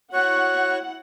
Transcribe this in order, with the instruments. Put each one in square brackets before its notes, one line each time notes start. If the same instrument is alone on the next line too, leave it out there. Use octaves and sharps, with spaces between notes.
[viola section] E4 F#5 [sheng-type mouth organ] F#4 C#5 C#6 [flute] F#6